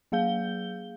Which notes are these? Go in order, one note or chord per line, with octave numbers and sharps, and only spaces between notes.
F#3 A#3 G#4 F5 G6 G7